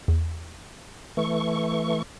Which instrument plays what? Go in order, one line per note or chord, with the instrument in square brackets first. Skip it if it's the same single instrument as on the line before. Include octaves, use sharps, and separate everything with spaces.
[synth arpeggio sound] E2
[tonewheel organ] E3 A3 C#6